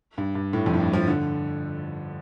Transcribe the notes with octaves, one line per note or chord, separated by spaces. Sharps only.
G2
G2
A2
F2
A2
G2
F3
D3